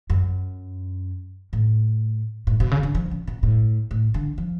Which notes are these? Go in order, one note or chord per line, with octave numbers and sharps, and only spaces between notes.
F#2
A2
A2
B2
C#3
D3
F3
C#3
B2
A2
A2
D3
F3